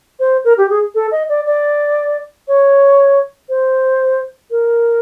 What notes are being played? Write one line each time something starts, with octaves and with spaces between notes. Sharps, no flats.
C5
A#4
G4
G#4
A4
D#5
D5
D5
C#5
C5
A#4